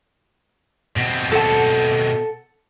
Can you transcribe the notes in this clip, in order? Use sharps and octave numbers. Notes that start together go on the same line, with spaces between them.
B2 C4
A4 F#5 A5